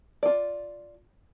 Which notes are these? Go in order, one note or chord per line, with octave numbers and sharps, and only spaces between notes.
F4 D5